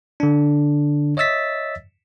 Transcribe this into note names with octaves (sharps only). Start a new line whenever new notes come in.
D3 D4
C#5 D#5 E5 E6 A6 B6